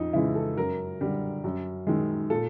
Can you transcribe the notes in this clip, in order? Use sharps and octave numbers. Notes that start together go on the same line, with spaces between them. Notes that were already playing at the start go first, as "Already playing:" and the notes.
Already playing: F2 D#4
C#3 E3 G#3 E4
A4
F#2 A#4
D3 G3
F#2
D#3 G#3
A#2 A4